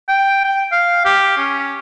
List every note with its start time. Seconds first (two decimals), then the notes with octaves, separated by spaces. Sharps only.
0.09 G5
0.44 G5
0.72 F5
1.05 G4
1.38 C#4